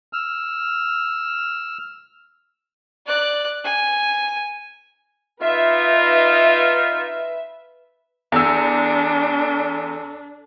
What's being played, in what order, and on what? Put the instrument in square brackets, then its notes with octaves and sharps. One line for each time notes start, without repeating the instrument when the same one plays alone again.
[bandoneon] E6 F6
[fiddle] D5 F#6
G#5
[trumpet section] D#4 F4 [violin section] B4 E5
[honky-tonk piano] E2 E6 [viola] D4 [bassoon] A4